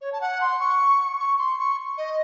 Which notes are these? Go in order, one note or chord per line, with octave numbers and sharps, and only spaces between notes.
C#5
A5
F#5
C6
C#6
C#6
C6
C#6
D#5